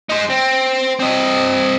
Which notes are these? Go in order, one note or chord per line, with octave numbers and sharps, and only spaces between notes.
D#4 C5
C4
C4 D#5